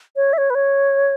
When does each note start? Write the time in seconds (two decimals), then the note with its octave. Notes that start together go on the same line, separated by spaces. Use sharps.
0.16 C#5
0.33 E5
0.38 C#5
0.50 B4
0.55 C#5